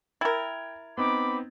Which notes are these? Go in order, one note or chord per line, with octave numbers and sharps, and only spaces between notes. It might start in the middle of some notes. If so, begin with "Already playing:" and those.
E4 A#4 G5 G#6 A6
B3 C4 D#4 B5 D6